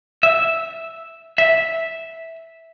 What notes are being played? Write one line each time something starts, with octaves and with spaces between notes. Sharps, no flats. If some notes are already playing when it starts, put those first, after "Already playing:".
E5
E5